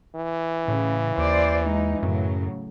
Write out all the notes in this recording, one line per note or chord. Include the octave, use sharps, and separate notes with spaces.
E3
A2 C#3
D#2 C5 D5
G#3 D#4
F#2 A2 C#3 F#3